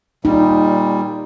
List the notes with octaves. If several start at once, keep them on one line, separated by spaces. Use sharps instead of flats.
A#2 G3 D#4